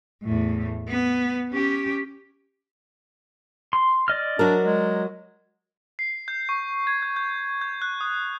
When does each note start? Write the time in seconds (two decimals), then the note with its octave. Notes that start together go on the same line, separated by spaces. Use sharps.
0.24 E2 A2
0.88 B3
1.52 C#4 G4
3.73 C6
4.08 D5 D#5 F6
4.39 F#3 D4 F#4 A#4
4.64 G#3
5.99 C7
6.28 G6
6.49 C#6
6.87 G#6
7.02 G6
7.16 G6
7.61 G6
7.82 F#6
8.01 D#6